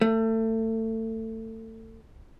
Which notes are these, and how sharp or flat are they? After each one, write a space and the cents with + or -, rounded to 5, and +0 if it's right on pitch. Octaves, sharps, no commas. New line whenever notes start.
A3 +25